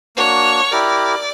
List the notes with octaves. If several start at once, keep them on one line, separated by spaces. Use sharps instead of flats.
A#3 D4 F#4 C#5
E4 G4 A#4 D5